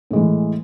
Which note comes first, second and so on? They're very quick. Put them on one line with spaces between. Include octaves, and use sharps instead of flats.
A2 G#3 E3